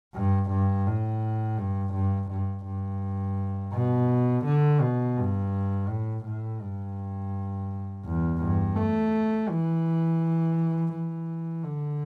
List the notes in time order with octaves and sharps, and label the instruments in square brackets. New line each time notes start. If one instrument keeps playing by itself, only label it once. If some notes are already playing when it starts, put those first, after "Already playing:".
[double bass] G2
G2
A2
G2
G2
G2
G2
B2
D3
B2
G2
A2
A2
G2
E2
G2
A3
E3
E3
D3